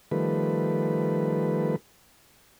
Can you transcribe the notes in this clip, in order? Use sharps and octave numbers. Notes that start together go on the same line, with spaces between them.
D#3 F3 G3 A3 B4